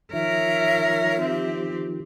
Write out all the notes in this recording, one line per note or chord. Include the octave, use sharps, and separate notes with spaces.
D#3 F3 A#4 C#5 E5
C4 G4